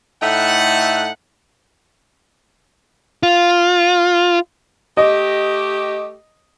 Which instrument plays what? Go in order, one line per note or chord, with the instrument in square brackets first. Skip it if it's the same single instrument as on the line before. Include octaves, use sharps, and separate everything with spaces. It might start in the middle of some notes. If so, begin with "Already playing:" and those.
[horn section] A2 A3 D#4 E5 F#5
[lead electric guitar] F4
[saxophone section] A3 G4 [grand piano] D#5